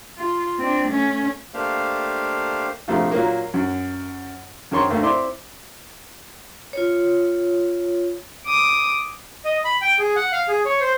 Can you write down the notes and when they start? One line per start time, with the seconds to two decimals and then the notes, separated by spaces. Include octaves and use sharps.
0.17 F4
0.58 C4 D4
0.88 A3 C#4
1.54 A3 A#3 D4 G4 C5 F5
2.88 A#1 C3 A3 F4
3.11 A#2 F#3 A#3
3.54 F#2
4.71 F#2 D#3 C#5 C6 C#6
4.89 D2 A3 A#3
5.01 C4 E4 D5 C6
6.73 F4 C#5
8.46 D6 D#6
9.45 D#5
9.65 B5
9.81 G5
9.99 G#4
10.16 F#5
10.32 F5
10.48 G#4
10.65 C#5
10.81 C5